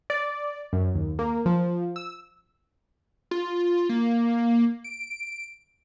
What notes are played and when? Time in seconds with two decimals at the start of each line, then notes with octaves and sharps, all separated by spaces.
0.10 D5
0.73 F#2
0.95 D#2
1.19 A#3
1.46 F3
1.96 E6
3.31 F4
3.89 A#3
4.84 D7